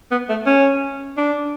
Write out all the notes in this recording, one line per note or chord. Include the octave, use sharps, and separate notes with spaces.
B3
A3
C#4
D4